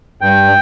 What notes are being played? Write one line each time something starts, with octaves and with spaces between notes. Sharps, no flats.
G2 G5